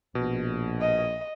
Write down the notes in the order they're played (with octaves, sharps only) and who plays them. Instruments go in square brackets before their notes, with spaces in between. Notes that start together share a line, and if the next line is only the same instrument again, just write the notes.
[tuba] A#1 [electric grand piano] B2
[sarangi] D#5